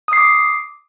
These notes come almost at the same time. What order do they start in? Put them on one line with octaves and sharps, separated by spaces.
D#6 C7 D6